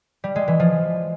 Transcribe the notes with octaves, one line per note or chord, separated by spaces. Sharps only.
G3
G#3
E3
F3